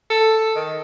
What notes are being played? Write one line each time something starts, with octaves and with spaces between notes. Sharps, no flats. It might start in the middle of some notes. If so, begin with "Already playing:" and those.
A4
D#3